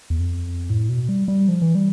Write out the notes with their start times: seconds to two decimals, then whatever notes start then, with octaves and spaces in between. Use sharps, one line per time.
0.10 E2
0.20 F2
0.70 A2
0.89 B2
1.09 G3
1.28 G3
1.48 F3
1.62 E3
1.75 G3